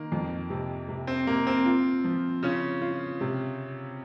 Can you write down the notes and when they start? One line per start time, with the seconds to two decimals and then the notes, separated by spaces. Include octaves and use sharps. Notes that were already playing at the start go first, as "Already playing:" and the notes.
Already playing: D#3 A#3
0.12 F2
0.50 C3
0.88 C3
1.07 C4
1.27 C3 A#3
1.47 C4
1.66 F4
2.04 F3
2.43 C#3 C#4 F4
2.81 F4
3.21 C3